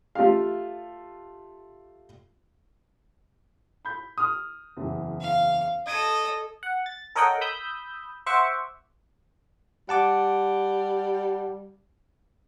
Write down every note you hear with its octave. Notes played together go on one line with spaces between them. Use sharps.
A3 F4 G4 F5
B5 G6
D#6 F6
F#1 E2
F5
A4 D#5 G#6 D7 D#7
F#5
A6
A4 A#4 C#5 D#5 F#5 G5
B5 D#6 E6 G6
C5 E5 F#5 C#6 D6
G3 F#5 A5 D6